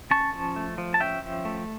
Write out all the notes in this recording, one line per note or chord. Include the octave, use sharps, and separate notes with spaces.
C#4 A5 C#6
F3
A3
F3
A5
C#4 E5 G5
F3
A3